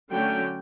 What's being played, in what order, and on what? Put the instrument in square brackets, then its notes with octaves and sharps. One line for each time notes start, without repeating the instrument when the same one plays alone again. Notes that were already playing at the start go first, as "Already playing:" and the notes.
[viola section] D3 F#3 A3 C#4 G5